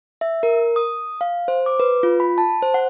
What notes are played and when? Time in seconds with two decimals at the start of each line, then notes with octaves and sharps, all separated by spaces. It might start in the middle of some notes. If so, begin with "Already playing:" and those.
0.21 E5
0.43 A#4
0.76 D#6
1.21 F5
1.48 C5
1.66 D6
1.80 B4
2.03 F4
2.20 B5
2.38 A5
2.63 C5
2.74 F#5